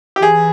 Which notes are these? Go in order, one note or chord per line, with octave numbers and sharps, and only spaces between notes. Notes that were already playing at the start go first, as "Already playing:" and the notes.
G4
E3 G#4